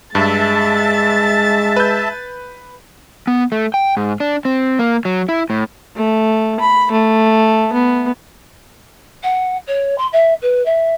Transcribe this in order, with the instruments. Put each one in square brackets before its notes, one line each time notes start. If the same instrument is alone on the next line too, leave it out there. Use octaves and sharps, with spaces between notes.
[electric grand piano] G2 [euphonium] G#3 [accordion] E5 A5 [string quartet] A6
[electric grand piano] B4 G6
[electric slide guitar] B3
A3
G5
G#2
D4
C4
A#3
F#3
E4
A2
[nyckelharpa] A3
B5
A3
B3
[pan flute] F#5
C#5
C6
E5
B4
E5